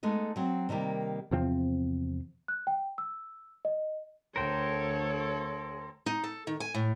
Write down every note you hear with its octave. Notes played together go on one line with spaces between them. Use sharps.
G#3 A3 B3 D#4
F#3 C4
C3 D#3 G3 A#3
E2 C3 F3 C4
F#6
G5
E6
D#5
D2 A4 A#4 C5 C#5 G5
D#4
A4
D#3
G#5
A2